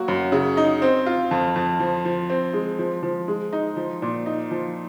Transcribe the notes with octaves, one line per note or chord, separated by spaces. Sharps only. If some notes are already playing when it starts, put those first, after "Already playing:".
Already playing: F#3 A#3 F#4
F#2
C#3
D#4
C4
F4
F2
F2
F3
F3
C4
G#3
F3
F3
G#3
D#4
F3
A#2
D#4
F3